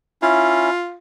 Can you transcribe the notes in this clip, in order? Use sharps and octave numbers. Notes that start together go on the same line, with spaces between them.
C#4 E4 F4